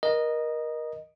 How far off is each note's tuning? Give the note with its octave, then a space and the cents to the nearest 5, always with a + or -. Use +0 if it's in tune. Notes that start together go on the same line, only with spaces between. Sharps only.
A#4 +25 D#5 -10